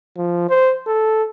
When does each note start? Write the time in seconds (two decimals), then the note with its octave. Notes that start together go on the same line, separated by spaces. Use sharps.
0.17 F3
0.49 C5
0.87 A4